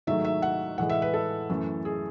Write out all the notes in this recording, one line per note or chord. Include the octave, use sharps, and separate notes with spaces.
G#2 D#3 F#3 A3 E5
E5
F#5
A2 E3 G#3 F#5
E5
B4
A4
F#2 E3 A3
G#4